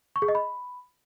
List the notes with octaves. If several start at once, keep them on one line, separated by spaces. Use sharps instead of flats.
C#6
G#4
D#5
B5